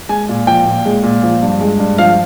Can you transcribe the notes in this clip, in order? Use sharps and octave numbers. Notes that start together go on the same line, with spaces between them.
G#3 G#5
A#2
F3 G5
A#2
G#3
A#2
F3
G2
G#3
G2
F3 F5